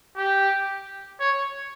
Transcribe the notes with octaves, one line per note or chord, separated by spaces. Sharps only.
G4
C#5